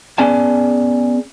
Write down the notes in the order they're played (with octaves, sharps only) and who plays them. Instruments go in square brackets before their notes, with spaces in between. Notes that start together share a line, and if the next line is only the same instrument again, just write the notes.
[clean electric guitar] B3 C#4 G#4 D5 G#5 A5